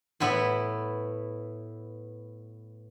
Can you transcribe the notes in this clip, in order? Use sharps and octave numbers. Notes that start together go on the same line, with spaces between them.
A2 B3 E4 B5